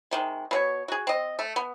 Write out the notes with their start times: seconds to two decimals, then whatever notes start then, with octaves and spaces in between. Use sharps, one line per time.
0.11 C3 D#3 G#3
0.51 B2 C4 C#5
0.88 F#4 G#4
1.07 C4 D#5
1.39 A3
1.56 B3